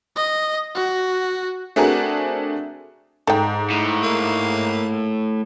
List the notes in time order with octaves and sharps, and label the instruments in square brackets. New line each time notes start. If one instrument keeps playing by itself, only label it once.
[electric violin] D#5
F#4
[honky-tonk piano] A3 C4 D4 F#4 G#4 A#4
[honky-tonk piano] G#2 [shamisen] A4 G5
[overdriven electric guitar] A2
[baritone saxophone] A#3